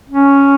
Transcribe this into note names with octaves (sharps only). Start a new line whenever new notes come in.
C#4